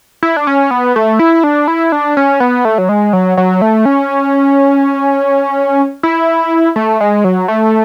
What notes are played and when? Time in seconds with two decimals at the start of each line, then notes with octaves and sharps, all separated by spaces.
0.23 E4
0.37 D4
0.47 C#4
0.71 B3
0.96 A3
1.19 E4
1.44 D4
1.68 E4
1.92 D4
2.17 C#4
2.40 B3
2.65 A3
2.78 F#3
2.89 G#3
3.13 F#3
3.37 F#3
3.62 A3
3.85 C#4
6.03 E4
6.76 A3
7.01 G#3
7.24 F#3
7.48 A3